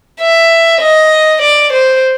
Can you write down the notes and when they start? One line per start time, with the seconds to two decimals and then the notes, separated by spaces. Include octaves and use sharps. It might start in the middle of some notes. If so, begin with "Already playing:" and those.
0.20 E5
0.81 D#5
1.42 D5
1.73 C5